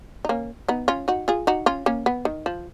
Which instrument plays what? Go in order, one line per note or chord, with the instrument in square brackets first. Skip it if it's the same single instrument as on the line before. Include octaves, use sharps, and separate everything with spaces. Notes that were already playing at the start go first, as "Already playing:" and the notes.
[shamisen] D#4
A#3 C#4
B3 D#4
C#4 F4
D#4 F#4
F4 G#4
D#4 F#4
C#4 F4
A#3 C#4
B3
D#3
F3